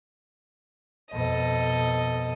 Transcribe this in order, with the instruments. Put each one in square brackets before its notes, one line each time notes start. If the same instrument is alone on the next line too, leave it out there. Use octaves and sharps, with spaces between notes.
[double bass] F2 B2 [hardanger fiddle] A4 D#5